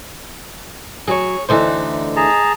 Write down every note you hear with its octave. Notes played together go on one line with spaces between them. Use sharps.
F#3 G#4 C#5
D2 D3 E3 D#4 C5
G#4 A5 A#5